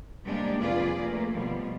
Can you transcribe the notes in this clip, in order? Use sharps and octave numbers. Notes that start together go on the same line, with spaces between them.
C3 G3 G#3 A#3 D4 G4
F2 C3 F4 G#4 B4 D5
A3 A#3
B2 F3 G3